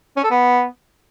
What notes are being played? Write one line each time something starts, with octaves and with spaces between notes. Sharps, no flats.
C#4
A4
B3